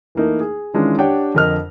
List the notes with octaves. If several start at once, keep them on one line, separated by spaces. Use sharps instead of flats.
E3 A3 A#3 D#4
G#4
D#3 E3 G#3 C#4 D4 F4
D4 G4 C#5 D5 F#5 G5
F2 D3 A#4 D#5 F6